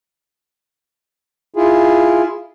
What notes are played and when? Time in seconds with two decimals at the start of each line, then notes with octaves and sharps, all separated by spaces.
1.56 E4 F4 G#4